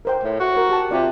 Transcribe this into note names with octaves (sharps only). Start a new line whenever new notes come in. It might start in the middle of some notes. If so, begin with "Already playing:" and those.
A#4 C5 G5
A2
F#4
A#4
G4 A5
C3 F4 D5